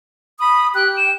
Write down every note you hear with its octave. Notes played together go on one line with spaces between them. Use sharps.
B5 D#6
G4 G5 F#6
E7